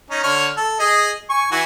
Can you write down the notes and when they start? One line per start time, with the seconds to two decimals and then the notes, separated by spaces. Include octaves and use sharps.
0.10 C#4 D#4
0.23 D3 C#5 F6
0.57 A4
0.80 G#4 D#5
1.30 G#5 C#6
1.51 E3 F#4 G#5